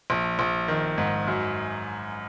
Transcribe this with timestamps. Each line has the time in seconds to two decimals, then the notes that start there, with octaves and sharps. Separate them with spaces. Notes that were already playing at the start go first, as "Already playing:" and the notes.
0.10 A#1
0.39 A#1
0.68 D#3
0.98 G#2
1.28 F#2